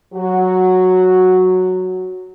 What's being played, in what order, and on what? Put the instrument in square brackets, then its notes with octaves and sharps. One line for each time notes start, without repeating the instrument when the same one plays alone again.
[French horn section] F#3 F#4